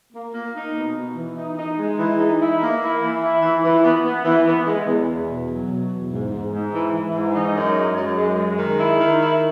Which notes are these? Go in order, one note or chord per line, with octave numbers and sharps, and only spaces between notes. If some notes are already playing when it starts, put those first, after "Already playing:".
A#3
A#3
D#4
B2
B2
E3
D#4
D#4
G#3
E3
D#4
E4
A#3
E4
E3
E4
E3
E3
B3
B3
E3
B3
G#3
E2
E2
B2
F#3
B2
E2
G#2
G#2
G#2
E3
E3
G#2
D#4
F#2
G#3
F#2
G#3
G#3
D#3
E4
D#3
E4